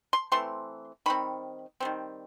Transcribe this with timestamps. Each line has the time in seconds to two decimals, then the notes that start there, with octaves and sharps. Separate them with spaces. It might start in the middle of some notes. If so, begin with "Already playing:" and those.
0.13 C6
0.32 E3 A3 C4 C6
1.06 D#3 G3 C4 B5
1.80 D#3 G3 C4